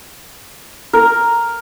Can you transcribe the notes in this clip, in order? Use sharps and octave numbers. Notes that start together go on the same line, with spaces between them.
A#4